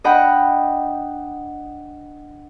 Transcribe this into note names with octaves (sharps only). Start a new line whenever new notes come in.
D4 D#5 F#5 G5 B5